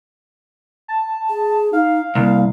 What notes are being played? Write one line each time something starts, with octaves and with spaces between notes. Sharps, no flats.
A5
G#4
D#4 F5
C2 A#3